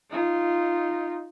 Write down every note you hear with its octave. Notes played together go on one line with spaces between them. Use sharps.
D#4 F4